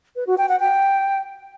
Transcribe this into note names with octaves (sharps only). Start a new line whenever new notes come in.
B4
F#4
G5
F#5
G5